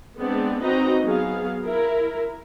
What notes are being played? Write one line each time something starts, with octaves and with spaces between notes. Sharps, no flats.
G#3 B3 C4 D4
C4 D#4 F#4 B4 D#5 A#5
F#3 B3 G#4 F5
E4 A#4